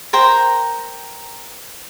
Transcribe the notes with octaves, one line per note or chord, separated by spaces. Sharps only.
A#4 C5 G5 A#5